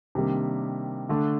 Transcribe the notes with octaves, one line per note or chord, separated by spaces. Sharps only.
C3 D#3 G3 A#3 D4
D3 A3 D4